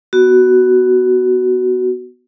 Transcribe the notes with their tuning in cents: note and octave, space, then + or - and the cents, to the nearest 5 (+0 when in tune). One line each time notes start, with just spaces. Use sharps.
B3 +0 F#4 +10